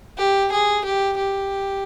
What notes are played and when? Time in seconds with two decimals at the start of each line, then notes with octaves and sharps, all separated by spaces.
0.18 G4
0.52 G#4
0.85 G4
1.17 G4